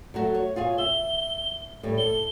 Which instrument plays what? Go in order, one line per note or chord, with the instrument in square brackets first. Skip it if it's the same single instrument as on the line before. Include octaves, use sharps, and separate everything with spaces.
[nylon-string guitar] F#3 A3 F#4
C#5
F4 G#4 C#5
[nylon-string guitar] E5 [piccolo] G7
[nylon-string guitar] A2 G3
[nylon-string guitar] A4 [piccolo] G7